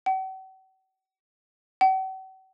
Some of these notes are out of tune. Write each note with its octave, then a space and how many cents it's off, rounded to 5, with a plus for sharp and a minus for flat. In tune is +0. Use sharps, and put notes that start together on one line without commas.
F#5 +45
F#5 +45